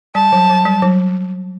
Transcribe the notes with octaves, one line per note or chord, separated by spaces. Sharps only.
G3 A5
F#3
F#3
G3
F#3